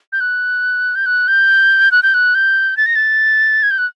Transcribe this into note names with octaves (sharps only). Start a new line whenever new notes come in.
G6
F#6
G6
F#6
G6
F#6
G6
F#6
G6
A6
A#6
A6
G#6
G6
F#6